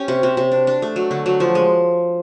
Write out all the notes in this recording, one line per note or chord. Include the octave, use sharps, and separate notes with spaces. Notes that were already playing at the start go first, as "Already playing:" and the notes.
Already playing: C#4 G4
C3
C3
C3
D4
D4
A3
F#3
D3
F#3
F3
G#3